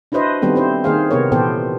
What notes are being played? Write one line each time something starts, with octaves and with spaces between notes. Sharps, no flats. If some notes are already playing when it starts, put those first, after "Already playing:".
D4 E4 F#4 B4 C5 D#5
D#3 G3 B3 C4 A4
C4 E4 C5
D#3 A#3 G#4 C5 F5
C3 B3 A#4 C#5
A#2 E3 B3 G4 A4 C5